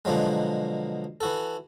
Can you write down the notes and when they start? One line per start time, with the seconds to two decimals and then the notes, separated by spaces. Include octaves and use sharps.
0.05 B2 D3 F3 F#3 G#3
1.21 E3 F#4 A4